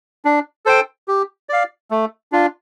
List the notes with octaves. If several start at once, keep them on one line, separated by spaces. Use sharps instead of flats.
D4
A4 C5 G5
G4
D5 F5
A3
D4 F4